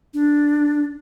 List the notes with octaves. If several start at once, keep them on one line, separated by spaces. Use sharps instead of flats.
D4